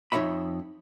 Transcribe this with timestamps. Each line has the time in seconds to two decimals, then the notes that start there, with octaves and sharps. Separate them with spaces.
0.12 F2 D#4 C#5 E5 B5